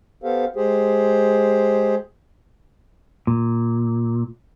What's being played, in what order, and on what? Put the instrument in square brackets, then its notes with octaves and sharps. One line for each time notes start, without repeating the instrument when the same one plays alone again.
[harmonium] B3 G4 A4 C5 F5
G#3 G4 G#4 C5
[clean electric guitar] A#2